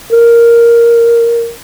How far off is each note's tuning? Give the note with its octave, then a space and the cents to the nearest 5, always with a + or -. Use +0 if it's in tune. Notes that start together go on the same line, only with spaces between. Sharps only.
A#4 +0